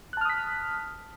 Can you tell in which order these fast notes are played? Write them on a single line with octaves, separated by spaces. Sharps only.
F#6 A5 F6 D#6 B6